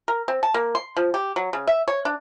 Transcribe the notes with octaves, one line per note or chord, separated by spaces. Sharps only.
A#4
C4
A5
A#3
C6
F3
G4
F#3
C#3
E5
C#5
D4